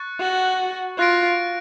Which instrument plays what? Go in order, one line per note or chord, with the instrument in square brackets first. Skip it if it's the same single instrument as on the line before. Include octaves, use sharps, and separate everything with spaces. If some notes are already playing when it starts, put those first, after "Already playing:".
Already playing: [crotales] C#6 F#6 A6 C#7
[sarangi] F#4
[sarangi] F4 [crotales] F#6 A#6 D7